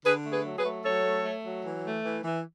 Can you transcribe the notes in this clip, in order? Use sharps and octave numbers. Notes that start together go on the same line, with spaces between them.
D3 G#4 B4
A3
G#4 B4
F#3
G#4 B4
A3
F#3 A4 C#5
A3
A3
F#3
E3
A3
E3
E3